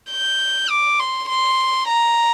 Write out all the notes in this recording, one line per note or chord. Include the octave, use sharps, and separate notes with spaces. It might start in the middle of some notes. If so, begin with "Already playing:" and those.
G6
D6
C6
C6
A#5